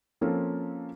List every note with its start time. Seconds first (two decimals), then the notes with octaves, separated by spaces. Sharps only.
0.21 F3 A#3 C4 C#4 F4 A4